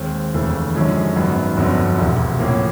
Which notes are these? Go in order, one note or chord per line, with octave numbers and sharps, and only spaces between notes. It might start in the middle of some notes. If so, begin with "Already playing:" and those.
Already playing: D#2 D#3 G#3 C4
F1 D#2 C#3 E3 A3
F#2 D3 F3 G#3 C#4
G#1 F#2 D#3 F#3 B3
G1 F2 D3 F#3 B3
E1 D2 C3 E3
A2 F3 A#3 C#4